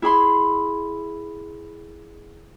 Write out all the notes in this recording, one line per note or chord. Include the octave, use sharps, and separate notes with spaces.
E4 G#4 B5 C6